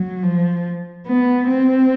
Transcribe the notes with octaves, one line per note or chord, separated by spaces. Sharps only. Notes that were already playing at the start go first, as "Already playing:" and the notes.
Already playing: F#3
F3
B3
C4